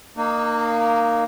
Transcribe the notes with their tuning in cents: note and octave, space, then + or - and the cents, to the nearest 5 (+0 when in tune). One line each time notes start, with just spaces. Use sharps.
A#3 -5 D#4 -35